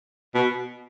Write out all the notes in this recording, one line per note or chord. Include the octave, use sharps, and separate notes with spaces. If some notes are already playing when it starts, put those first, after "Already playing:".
B2